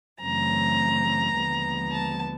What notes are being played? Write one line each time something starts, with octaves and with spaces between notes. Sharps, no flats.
F#2 C#3 E3 A3 C4 A#5
D#2 D3 F3 G#3 B3
A5